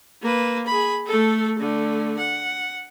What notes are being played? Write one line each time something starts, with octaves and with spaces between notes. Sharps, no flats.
A#3 B4
G#4 B5
A3 A4
D3 A3
F#5